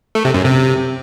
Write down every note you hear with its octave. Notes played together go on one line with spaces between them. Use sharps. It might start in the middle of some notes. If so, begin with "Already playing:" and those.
A3
C3
F#2
C3